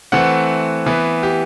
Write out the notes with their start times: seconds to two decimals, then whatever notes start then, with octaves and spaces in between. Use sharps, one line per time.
0.12 E3 A3 C4 F#5
0.86 E3 B3
1.23 G4